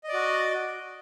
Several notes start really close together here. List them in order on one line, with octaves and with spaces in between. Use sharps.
D#5 D5 F#4